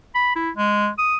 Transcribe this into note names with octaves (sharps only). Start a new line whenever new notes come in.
B5
E4
G#3
D#6